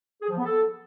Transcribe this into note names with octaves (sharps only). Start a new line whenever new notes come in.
G#4
F3
B3
A4